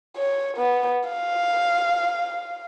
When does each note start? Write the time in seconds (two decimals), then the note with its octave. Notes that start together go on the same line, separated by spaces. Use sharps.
0.17 C#5
0.57 B3
1.09 F5